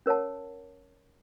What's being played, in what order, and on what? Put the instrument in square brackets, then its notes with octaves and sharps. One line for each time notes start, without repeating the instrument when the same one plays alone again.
[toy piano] C#4 A#4 C#5 F#5 A5